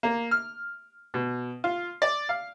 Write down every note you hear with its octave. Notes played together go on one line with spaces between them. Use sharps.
A#3
F6
B2
F4
D5
F5